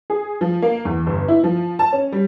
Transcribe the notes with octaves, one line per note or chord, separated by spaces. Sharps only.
G#4
F3
A#3
E2
G1
E4
F3
A5
C#4
G3